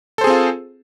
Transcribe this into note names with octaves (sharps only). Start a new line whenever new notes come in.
C4 F4 G#4 A4 C5